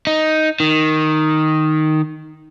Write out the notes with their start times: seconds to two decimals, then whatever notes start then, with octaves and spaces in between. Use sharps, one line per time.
0.07 D#4
0.60 D#3